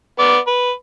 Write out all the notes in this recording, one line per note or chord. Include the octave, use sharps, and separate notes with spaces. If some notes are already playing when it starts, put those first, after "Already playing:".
B3 D5
B4